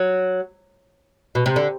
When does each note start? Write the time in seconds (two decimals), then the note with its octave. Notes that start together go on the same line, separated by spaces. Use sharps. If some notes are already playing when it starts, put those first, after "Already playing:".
Already playing: F#3
1.35 B2
1.46 C3
1.56 D3